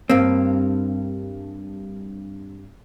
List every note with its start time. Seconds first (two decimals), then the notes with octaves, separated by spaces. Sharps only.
0.10 G2 A#3 C4